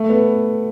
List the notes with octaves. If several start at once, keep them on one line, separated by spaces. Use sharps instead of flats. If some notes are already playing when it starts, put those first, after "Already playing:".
Already playing: A3
B3